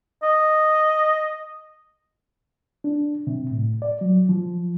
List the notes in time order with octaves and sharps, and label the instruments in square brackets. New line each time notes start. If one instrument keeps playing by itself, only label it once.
[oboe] D#5
[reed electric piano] D4
C3
A2
D5
F#3
F3